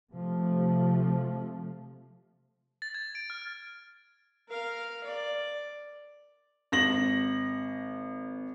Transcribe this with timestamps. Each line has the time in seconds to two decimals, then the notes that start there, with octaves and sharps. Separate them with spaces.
0.12 C3 F3 A3
2.82 A6
2.94 G#6
3.15 D7
3.30 F6
4.48 A#4 F5
5.04 D5
6.72 G#1 A#6 F#7